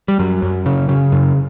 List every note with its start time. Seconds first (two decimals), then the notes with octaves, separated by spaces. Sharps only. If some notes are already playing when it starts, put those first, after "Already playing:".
0.08 G3
0.19 F#2 F#3
0.42 F#2
0.66 C#3
0.89 C#3
1.12 F#2